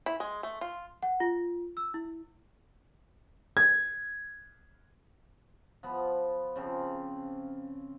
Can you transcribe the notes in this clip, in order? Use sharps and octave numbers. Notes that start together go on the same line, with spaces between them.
E4
G#3
A3
F4
F#5
F4
E6
E4
G#6
F3 B3
C#3 F3 C4